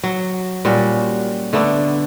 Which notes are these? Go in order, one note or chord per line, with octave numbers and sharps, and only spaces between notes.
F#3
A#2 G3 C#4 F#4
D3 A3 B3 D4